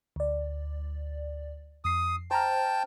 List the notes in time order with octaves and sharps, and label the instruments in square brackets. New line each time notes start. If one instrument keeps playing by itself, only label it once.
[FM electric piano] D2 D5
[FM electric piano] F2 C7 [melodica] D#6
[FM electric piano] C5 A#5 F6 [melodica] G5 A5